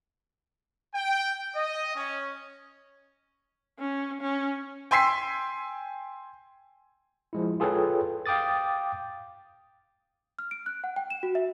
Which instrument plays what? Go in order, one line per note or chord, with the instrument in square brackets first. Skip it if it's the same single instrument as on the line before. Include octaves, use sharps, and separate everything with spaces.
[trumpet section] G5
D#5
C#4
[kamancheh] C#4
C#4
[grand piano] G5 G#5 C6 E6 B6 C7
[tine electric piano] F3 G#3 E4
F4 G#4 A4 B4 C#5 G5
F5 G5 D6 D#6 A6
[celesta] F6
D7
F#6
F#5
G5
E7
F#4
E5